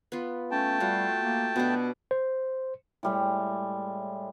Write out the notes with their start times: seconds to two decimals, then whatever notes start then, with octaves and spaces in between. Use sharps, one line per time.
0.12 B3 F4
0.51 A3 C#4 G5 A5
0.80 G3 F4 F#4 F5
1.23 A#3
1.56 B2 B3 D4
2.11 C5
3.03 A2 G3 G#3